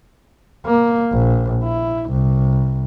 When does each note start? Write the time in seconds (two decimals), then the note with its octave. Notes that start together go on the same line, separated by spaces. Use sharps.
0.66 A#3
1.12 A#1
1.64 E4
2.10 C2